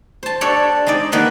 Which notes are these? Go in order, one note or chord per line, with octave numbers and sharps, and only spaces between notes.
C5 A5
D4 G4 A4 C#5 D5
G#3 C4 D#4 D5
D#3 A#3 B3 B4